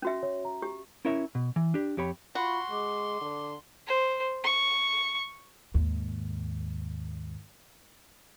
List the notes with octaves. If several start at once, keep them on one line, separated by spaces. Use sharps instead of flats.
C#4 F#4 E5
C#5
A#5
G4
C#4 E4 A#4 C#5 E5
B2
E3
D4 G4
F2 G4 C#5 B5
F4 F#4 B5 C6
G#3 D6
D3
C5
C#6
D#2 G#2